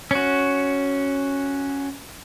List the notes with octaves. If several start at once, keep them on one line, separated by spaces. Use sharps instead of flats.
C#4 F#4